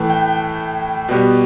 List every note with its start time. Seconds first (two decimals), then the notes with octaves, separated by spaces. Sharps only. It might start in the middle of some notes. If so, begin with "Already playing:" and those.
Already playing: A2 E3 A3
0.10 G5
1.09 B2 G3 B3